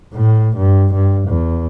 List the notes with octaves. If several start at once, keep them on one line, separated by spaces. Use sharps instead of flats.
A2
G2
G2
E2